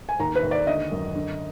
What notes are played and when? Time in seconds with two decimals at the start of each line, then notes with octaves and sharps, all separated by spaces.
0.09 G#5
0.20 D#2 A#5
0.35 B4
0.43 D#2
0.51 D5
0.67 D3 D#5
0.91 F#2
1.15 D3